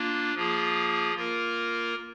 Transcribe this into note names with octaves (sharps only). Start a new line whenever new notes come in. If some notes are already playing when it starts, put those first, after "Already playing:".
Already playing: A#3 D4 F4
F3 A#3 F4 G#4
A#3 F4 A#4